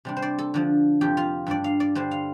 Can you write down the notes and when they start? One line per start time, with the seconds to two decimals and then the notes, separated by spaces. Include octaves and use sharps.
0.05 C3 G3 D4
0.17 C5
0.22 D5
0.38 A4
0.54 D3 F3 D4
1.01 F2 C3 F3 G4
1.17 F4
1.47 G2 G3 D4 D5
1.64 F5
1.80 D5
1.95 D3 G3 D4 C5
2.11 F5